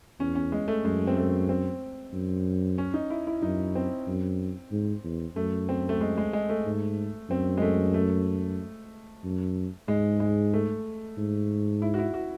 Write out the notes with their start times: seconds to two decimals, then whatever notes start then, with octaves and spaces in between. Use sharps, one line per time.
0.19 E2 C#4
0.35 C#4
0.52 G#3
0.68 A3
0.84 F#2 G#3
1.07 C4
1.17 A3
1.49 C4
2.13 F#2
2.78 C#4
2.94 D#4
3.10 E4
3.27 E4
3.42 F#2 D#4
3.75 C4
4.07 F#2
4.72 G#2
5.04 E2
5.36 F#2 A3
5.69 C4
5.89 A3
6.01 G#3
6.18 G#3
6.33 G#3
6.49 A3
6.66 G#2
7.30 F#2 C4
7.57 G#3
7.62 A3
7.94 A3
9.24 F#2
9.88 G#2 G#3
10.20 G#3
10.54 A3
11.17 G#2
11.82 E4
11.94 F#4
11.99 E4
12.14 F#4